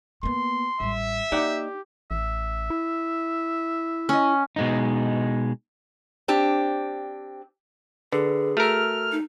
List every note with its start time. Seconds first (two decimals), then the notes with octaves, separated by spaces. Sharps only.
0.23 A#3 B3 C6
0.80 A1 G3 E5
1.32 A#3 D#4 G4 D5 F#5
2.11 A1 E5
2.70 E4
4.09 C#4 D#5
4.56 B2 G#3 D#4
6.28 C4 D4 G4
8.12 D3 G#4 B4
8.57 A3 F#4 A#4 E6 F6
9.12 D#4